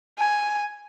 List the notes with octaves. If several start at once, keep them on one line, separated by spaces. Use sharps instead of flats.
G#5